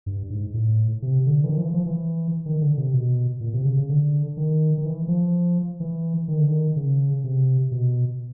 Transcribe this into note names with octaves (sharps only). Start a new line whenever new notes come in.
G2
G#2
A2
C3
D3
E3
D#3
F3
E3
F3
E3
D#3
D3
C3
B2
A#2
C3
C#3
C#3
D3
D#3
D#3
E3
F3
E3
D#3
D3
D#3
C#3
C3
B2